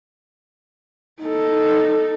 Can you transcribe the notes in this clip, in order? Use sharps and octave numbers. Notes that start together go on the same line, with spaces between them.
D#4 A4